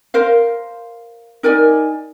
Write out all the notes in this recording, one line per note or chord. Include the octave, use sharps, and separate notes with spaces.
A#4 C5 F5
D#4 A#4 D5 G#5